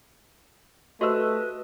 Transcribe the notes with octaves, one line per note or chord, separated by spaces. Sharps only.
A3 F#4 G4 B4 C5 D#5 E6